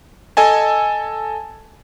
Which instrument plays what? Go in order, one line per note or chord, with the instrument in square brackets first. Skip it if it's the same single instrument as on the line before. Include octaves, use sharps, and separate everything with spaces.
[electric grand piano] A4 D#5 G#5 A5